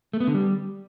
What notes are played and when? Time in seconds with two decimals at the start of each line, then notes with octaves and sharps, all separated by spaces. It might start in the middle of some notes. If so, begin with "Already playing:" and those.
0.13 A3
0.20 B3
0.27 D3
0.34 G3